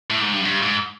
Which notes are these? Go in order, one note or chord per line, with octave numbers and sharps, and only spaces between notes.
A2
G#2
G2
F#2
G2
G#2